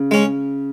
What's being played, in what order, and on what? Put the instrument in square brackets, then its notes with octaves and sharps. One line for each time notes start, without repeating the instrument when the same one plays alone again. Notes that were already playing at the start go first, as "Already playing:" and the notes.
Already playing: [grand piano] C#3
[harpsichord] G#3 C#4